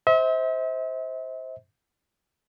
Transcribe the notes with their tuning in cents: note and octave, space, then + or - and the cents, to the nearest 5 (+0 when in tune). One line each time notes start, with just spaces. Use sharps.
C5 +0 E5 -40